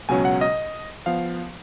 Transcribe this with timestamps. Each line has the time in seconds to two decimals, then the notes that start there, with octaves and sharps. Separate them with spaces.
0.09 C#2 B2 F#3 C#4 G#5
0.25 F#5
0.41 D#5
1.06 F3 B3 F5